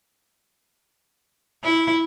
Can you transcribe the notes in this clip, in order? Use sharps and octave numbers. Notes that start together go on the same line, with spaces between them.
E4